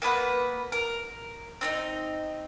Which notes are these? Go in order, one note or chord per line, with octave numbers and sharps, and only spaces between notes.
A#3 B3 B4 F#5
A#4
C4 D4 D#4